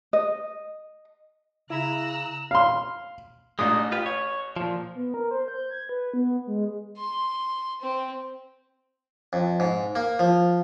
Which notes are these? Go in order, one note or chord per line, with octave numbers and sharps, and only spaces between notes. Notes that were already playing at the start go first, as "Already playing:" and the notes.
D#5
C#3 E4 A#5 E6 F#6
F5 C6
A1 G#3 D4 D#4 D#6
F4 G4 B4
C#5
A#2 F3
B3
A#4
C5
G6
G#6
B4
B3
G#3
C6
C4
F2
G#2
A#3
F3